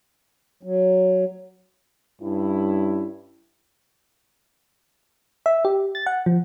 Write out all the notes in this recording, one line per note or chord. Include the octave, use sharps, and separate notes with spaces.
F#3
G2 C#4 E4
E5
G4
A6
F#5
F3